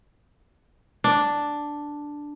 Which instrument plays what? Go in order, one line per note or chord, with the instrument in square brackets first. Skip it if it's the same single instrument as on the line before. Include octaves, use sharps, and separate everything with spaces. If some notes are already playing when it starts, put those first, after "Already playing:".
[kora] D4